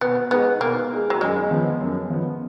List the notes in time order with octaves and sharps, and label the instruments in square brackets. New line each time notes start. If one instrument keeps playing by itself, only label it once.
[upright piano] B2 [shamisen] B3
[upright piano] G#3 D#4 G#4 [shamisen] B3
[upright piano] B2 [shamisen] A#3
[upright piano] G#3 D#4 G#4
[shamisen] F#3
[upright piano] F#2 [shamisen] G#3
[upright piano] F3 B3
F#2
F3 B3